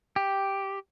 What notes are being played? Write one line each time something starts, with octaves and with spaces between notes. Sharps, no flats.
G4